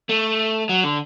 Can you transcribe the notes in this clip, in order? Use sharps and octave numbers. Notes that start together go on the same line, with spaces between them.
A3
F#3
D3